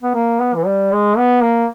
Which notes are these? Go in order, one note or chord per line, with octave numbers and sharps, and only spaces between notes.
B3
A#3
B3
E3
G3
G#3
B3
A#3